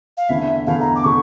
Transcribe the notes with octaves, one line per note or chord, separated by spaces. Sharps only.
F5
E2 D3 A3 E4 E5
E2 D3 A3 E4 F5
A#5
D6
D3 A3 E4 C#6